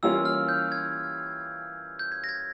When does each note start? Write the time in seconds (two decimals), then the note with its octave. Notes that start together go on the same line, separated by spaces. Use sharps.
0.03 E3 G3 A#3 C#4 F4 E6
0.25 F6
0.49 G6
0.72 G#6
1.99 G6
2.12 G#6
2.24 A#6
2.29 G#6